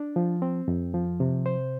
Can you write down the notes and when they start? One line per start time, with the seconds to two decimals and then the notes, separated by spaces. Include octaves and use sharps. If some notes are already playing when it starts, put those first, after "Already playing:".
Already playing: D4
0.16 F3
0.42 C4
0.68 F2
0.94 F3
1.20 C3
1.46 C5